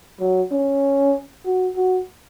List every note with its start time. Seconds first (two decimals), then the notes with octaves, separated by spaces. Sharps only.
0.20 F#3
0.52 C#4
1.45 F#4
1.76 F#4